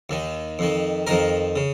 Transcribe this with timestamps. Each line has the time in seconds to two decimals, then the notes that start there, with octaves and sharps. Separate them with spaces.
0.10 D#2 D#3
0.59 F2 D#3
1.07 F2 D#3 A#4
1.56 C#3